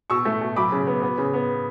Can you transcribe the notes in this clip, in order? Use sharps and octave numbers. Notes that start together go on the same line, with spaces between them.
B2 C#6 E6
A3
B2
F#3 B5 D6
C#3
B3
B3
C#3
B3